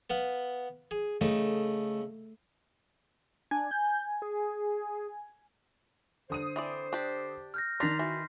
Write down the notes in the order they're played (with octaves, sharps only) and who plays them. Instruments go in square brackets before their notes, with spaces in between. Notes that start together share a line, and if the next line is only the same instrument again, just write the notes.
[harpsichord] B3 B4 F5
G#4
[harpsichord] C#3 D#4 [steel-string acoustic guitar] A3
[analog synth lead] D4 [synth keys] G#5
[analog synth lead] G6
G#4
[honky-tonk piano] D3 D#6 D#7 [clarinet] C5
[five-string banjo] E3 C4 D5
D4 G4
[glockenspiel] F6 G6 A#6
[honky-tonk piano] D#3 A6 [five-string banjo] D4 [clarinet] A#5 [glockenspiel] C6 B6 C7
[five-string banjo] E3 [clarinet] F#4